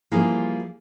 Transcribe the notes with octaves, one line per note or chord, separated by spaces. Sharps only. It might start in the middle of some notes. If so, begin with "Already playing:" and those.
E3 F3 G3 A#3 F4 G#4